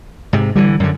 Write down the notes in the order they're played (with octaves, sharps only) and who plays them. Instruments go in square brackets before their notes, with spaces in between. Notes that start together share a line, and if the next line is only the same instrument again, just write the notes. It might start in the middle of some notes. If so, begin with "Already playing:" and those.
[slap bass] G#2 C3
[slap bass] D3 E3 [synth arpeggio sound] G3
[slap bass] F#2 D3